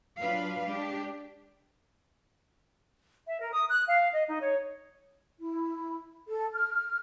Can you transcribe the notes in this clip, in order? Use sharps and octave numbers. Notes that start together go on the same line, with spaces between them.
F#3 D4 F4 B4 F5
G#3 D4 G4
E5
A#4
D#6
F#6
F5
D#5
D#4
C#5
E4
A4
F6